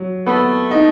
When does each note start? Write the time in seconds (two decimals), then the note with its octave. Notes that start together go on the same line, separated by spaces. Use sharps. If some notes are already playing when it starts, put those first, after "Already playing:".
Already playing: F#3
0.26 A3 B3
0.71 D#4